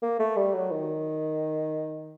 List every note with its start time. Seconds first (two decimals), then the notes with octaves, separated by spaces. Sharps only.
0.02 A#3
0.19 A3
0.37 G3
0.54 F#3
0.72 D#3